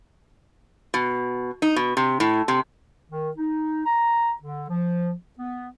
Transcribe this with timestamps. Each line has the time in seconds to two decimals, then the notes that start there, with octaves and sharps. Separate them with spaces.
0.94 B2
1.62 D#4
1.76 B2
1.97 C3
2.20 A2
2.48 C3
3.11 D#3
3.37 D#4
3.86 A#5
4.42 D3
4.70 F3
5.39 B3